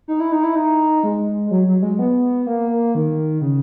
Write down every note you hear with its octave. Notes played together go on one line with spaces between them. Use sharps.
D#4
E4
D#4
E4
D#4
G#3
F#3
F#3
G#3
B3
A#3
A#3
D#3
C#3